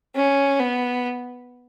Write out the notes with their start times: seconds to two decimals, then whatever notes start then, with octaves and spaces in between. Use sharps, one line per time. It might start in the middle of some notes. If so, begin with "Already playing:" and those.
0.16 C#4
0.60 B3